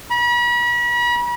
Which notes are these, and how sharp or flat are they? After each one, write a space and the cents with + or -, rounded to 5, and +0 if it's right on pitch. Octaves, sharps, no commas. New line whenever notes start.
B5 -40